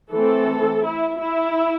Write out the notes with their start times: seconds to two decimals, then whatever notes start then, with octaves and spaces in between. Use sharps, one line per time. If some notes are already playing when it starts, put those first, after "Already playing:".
0.12 E3 A3 C4 A4
0.84 E4
1.21 E4